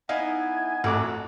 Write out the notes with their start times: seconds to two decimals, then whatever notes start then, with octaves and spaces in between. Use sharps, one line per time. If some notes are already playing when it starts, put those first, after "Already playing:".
0.09 B3 D#4 E4 D#5 F5 G#5
0.84 A1 F2 F#4 D6